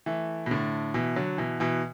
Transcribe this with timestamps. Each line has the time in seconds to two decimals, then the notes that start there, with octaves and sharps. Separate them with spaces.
0.06 E3 A3
0.46 B2
0.51 A2 D3
0.94 B2 E3
1.16 D3 F#3
1.38 B2 E3
1.60 B2 E3